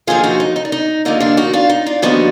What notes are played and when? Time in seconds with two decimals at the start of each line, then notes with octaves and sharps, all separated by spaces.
0.07 D#2 D3 F3 F4 G#4
0.24 D#4 F#4
0.40 D#4
0.56 D#4
0.65 D4
0.72 D#4
1.05 D#2 D3 F3 A#3 D#4
1.20 D4 F4
1.37 D#4 F#4
1.53 D4 F4
1.69 D#4
1.86 D4 F4
2.02 D#2 D3 F3 B3 D4 D#4 F#4